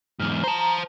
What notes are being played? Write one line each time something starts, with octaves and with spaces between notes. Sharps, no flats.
E2 G#2 F6
C5 A5 A#5